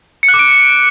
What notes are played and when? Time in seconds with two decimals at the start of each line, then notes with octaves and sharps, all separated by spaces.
0.23 C#7
0.28 F#6
0.34 D6
0.39 D7